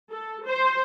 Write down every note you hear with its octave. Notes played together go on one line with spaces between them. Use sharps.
A4
C5